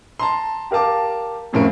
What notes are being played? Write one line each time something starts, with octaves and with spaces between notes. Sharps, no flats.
A5 A#5 C6
G4 A#4 F5 A5 D6
D1 F2 A2 C#4 A#4 D7